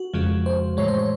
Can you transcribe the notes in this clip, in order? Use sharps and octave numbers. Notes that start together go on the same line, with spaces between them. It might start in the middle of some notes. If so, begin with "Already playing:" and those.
Already playing: F#4
F2 C#3 F3 G#3
C5
A2 E3 G#3 C#5
C5
C#5